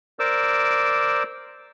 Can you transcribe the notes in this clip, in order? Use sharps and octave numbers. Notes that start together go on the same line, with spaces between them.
A#4 C5 D5 D6 E6